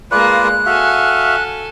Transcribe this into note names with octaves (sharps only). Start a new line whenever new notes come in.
G#3 A#3 F4 B4 D5 F#6
F#4 A4 E5 F5 G#5